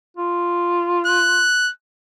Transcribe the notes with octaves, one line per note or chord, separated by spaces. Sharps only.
F4
F#6